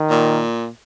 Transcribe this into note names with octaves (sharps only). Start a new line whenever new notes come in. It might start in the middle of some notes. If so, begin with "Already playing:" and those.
Already playing: D#3
A#2